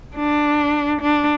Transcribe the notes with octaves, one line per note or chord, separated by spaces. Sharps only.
D4
D4